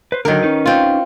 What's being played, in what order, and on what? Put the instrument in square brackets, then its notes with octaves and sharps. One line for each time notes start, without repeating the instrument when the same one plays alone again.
[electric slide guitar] B4 C5
[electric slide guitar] D3 F#3 [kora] D#3 A#4
[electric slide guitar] C#4 D#4 B4
[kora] C4 F4